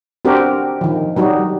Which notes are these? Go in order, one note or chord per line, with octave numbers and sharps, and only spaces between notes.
C4 D4 F#4 G4 A#4
D#3 F3
F#3 G3 D#4 F#4